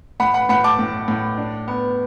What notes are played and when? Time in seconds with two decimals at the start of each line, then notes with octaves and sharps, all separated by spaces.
0.20 A2 F#5 B5
0.34 F#5 B5
0.49 A2 F#5 B5
0.64 A5 D6
0.79 A2
1.08 A2
1.38 D4
1.68 B3